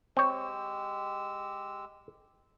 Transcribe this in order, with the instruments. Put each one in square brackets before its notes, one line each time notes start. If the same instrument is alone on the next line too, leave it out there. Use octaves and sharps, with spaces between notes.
[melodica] G#3 G4 E6 [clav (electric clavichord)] C4 C#5